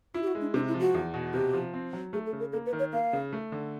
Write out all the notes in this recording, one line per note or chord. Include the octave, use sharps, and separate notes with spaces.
E4 F4
G4
F#4
G#3
D4
C3 D4
E4
F3
F#4
E2
B2
C3 G4
F3
C4
F#3
A3 G#4
A4
C#3
A#4
A#3 A4
B4
D#3
C#5
A#3 F5
C#3
A3
D3